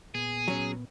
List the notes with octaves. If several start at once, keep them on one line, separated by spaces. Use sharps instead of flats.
A#2 B3 G#4
F#3 C#4